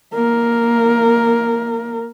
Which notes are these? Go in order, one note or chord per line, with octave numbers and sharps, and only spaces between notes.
A#3 A#4